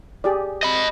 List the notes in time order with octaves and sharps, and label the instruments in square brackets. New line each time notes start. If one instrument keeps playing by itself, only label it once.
[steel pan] G4 G#4 D5
[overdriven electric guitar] D#5 B5